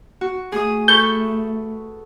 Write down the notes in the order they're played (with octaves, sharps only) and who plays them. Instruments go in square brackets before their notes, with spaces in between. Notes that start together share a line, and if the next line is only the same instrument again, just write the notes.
[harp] F#4
[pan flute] A3 [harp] G#4 D#6
[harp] A4 B4 C#6 [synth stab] G6